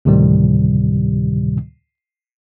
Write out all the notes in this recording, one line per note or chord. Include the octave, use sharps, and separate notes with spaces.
D2 A2 C3 D#3 G3